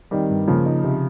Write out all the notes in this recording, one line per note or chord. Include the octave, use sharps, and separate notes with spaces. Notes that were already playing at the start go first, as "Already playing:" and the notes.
D#3 G3 C4
G2
C#3 F3 A#3
D#4
C3